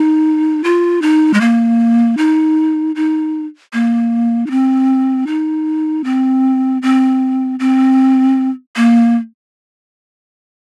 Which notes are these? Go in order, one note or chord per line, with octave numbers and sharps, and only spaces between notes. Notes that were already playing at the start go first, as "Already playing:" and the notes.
Already playing: D#4
F4
D#4
G#3
A#3
D#4
D#4
A#3
D#4
C4
D#4
C4
C4
C4
A#3